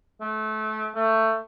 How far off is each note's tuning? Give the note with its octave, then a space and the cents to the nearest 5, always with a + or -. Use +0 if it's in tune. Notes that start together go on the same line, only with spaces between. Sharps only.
A3 -25
A3 +20